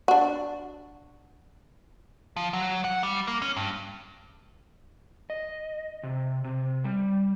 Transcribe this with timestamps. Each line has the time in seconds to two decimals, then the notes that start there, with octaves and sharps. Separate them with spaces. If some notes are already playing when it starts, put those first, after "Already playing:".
0.08 D4 F#4
2.37 F3
2.53 F#3
2.85 F#5
3.03 G3
3.27 A#3
3.42 C#4
3.57 G2
5.30 D#5
6.03 C3
6.44 C3
6.84 G3